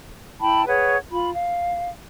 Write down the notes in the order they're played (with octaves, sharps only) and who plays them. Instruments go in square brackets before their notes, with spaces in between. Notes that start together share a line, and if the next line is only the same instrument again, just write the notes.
[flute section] E4 G5 A5 B5
G#4 B4 C#5 F#5
F4 B5
F5